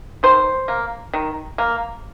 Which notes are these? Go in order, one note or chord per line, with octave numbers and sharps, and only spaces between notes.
D#3 C5
A#3
D#3
A#3